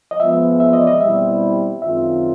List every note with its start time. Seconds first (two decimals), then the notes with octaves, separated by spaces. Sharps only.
0.11 D#5
0.20 F3 G#3 B3 E5
0.60 E5
0.73 D#5
0.81 D5
0.87 D#5
1.01 B2 G3 C4 E4 E5
1.81 F#2 D#3 G#3 C4 F4 E5